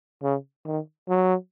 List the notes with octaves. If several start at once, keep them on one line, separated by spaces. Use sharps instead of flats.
C#3
D#3
F#3